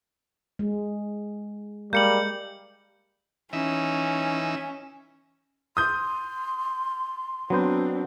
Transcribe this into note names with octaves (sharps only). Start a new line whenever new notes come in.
G#3
G3 G#3 A#3 G6 C#7 F#7
E3 C#4 D#4 E5
C6 D#6 G6
F#3 B3 C4 D4 C5